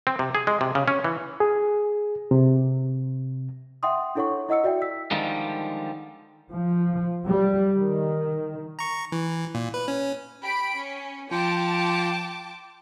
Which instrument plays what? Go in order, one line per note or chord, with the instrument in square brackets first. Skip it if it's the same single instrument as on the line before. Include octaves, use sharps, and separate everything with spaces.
[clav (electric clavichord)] C4
C3
G#4
G#3
C3
C#3
C#4
E3
[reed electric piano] G#4
C3
[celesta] E5 F#5 G5 C6 D#6
D4 E4 A4 C#5 F#5 C#6
E4 D#5 F#5 E6 C#7
F#4 D5 E5 G5
E6 B6
[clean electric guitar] D3 D#3 F3 G3 G#3
[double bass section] F3
G3
D#3
[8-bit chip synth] A#5 C#6
E3
A#2
B4
C#4
[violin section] G4 B5 D7
C#4
[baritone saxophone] F3 [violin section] G5 A5 D6